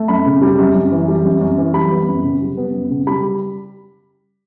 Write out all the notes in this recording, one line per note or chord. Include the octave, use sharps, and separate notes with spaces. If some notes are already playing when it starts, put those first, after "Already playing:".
Already playing: A3
F#2 B5
C#3
G3
F#2
F#2
E3
G3
F#2
F#2
E3
G3 B5
B3
F#2
C#3
G3
B3
F#2
C#3
G3 B5